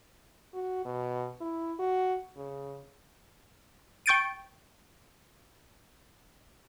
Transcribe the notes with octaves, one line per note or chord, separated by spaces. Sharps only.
F#4
B2
E4
F#4
C#3
G5 C#6 G6 A6 D7 D#7